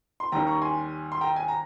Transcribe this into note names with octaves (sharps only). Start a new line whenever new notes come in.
C6
D#2 D#3 G3 G5 A#5
A#5 C#6
G#5 C6
C6
G5 A#5
G#5
A#5